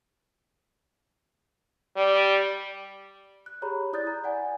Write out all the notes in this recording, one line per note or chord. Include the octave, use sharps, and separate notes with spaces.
G3
F#6
G4 G#4 C#5 A#5 B5
E4 D5 D#6 F#6 G6 A6
A#5
D5 F#5 G#5